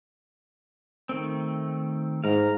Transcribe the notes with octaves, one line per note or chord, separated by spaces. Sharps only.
D#3 A3 C4
G#2 F5 A#5